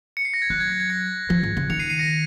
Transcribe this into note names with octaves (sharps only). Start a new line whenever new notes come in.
C#7
C7
A#6
G#6
F#3 F#6
G#6
A#6
G#6
A#6 C#7
F3
G#2
C#3
D#3 C#7 F7
C7 D#7
C7 D#7
A#6 C#7